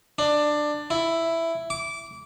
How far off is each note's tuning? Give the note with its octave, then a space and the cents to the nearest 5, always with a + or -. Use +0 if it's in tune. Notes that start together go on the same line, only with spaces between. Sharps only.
D4 +15
E4 +5
D6 -20